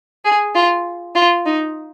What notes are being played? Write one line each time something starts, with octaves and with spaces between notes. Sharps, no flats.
G#4
F4
F4
D#4